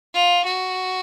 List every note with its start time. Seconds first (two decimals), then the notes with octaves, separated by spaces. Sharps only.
0.14 F4
0.45 F#4